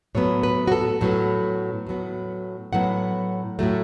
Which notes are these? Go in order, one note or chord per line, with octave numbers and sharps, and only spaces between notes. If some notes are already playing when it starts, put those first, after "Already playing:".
A2 F#3 B3 C#5
B4
F#4
A4
A2 F#3 B3 A4
A2 F#3 B3
A2 F#3 B3 F#5
A2 F#3 A3